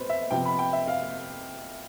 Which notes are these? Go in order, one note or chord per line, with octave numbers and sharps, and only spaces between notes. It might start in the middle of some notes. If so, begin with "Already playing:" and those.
Already playing: B2 A3 C4 B4 C5
E5
C3 F3 B3 G5
B5
G5
E5
F5